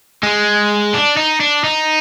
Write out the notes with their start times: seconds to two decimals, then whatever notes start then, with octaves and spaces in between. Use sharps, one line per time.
0.23 G#3
0.94 D4
1.17 D#4
1.40 D4
1.64 D#4